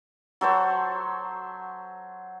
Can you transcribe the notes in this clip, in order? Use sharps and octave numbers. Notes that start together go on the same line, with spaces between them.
F#3 A4 C5 C#6